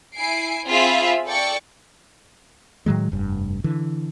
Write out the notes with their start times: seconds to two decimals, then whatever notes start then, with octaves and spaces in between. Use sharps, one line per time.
0.16 E4 G#5 C7 D7
0.67 C4 F4 G#4 E5 B5
1.25 A4 D5 G5 C#6 A6 C#7
2.86 A2 D#3 F#3 G#3
3.12 F1 G2
3.64 D3 E3